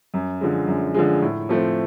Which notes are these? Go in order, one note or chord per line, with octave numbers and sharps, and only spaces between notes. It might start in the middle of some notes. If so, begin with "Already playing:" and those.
F#2
D3 F3 G#3
F#2
D3 F3 G#3
A2
F3 A3 C4